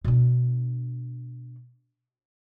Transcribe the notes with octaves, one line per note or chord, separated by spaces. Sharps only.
B2 D4